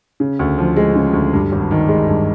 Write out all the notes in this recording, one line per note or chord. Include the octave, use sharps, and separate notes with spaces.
C#3
D2
F3
G#3
C#3
D2
G2
G#1
D#3
G#3
G2